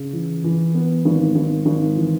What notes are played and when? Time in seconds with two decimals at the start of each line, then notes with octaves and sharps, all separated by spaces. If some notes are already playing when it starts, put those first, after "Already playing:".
Already playing: C#3
0.13 E3
0.44 E3
0.74 B3
1.05 G#1
1.36 G#1
1.66 G#1
1.96 E3